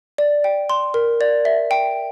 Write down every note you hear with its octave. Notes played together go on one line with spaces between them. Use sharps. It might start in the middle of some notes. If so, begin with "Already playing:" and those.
D5
G5
C6
A#4
D5
E5
G5